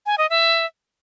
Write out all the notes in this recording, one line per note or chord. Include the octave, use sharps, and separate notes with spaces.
G#5
D#5
E5